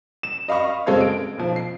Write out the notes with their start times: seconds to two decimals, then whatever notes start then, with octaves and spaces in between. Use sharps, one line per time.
0.23 E7
0.48 D#5 F5 B5 C#6
0.86 F#1 G#3 C4 A4 F5 G#6
1.01 D7
1.38 B1 F3
1.56 C7